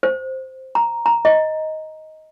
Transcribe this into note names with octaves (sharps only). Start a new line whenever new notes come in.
C5
A#5
A#5
D#5